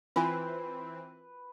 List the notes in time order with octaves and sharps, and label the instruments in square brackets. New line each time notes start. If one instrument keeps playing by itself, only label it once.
[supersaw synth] E3 C4 [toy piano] F4 G#5 [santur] B4